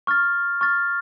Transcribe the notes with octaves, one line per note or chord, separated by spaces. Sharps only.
C#6 F6 A6
C#6 F6 A6